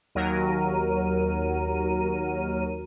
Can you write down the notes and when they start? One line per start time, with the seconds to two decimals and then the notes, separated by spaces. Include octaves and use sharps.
0.15 D#2 F#3 A#4 D#7